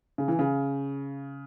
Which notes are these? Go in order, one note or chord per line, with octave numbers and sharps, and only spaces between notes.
C#3
E3
C#3